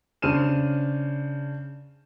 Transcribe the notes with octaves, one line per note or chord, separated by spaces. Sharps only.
C#3 D4 C5 F6 D#7 E7